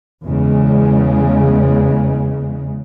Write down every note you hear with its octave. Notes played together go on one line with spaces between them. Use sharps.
E2 C#3 G#3